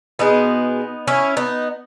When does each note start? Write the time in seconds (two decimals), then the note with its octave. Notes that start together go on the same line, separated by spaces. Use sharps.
0.19 B2 G#3 B3 D#4
1.07 C#4 E4
1.37 B3 D#4